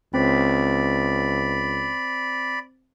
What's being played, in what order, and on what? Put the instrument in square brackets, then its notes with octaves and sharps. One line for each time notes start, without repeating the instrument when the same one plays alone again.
[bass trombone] C#2 [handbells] C4 C5 B6 [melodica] D5 B5